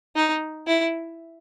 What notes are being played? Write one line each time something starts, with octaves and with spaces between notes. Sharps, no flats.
D#4
E4